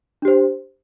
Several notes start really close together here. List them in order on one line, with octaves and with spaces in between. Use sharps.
D4 G4 C5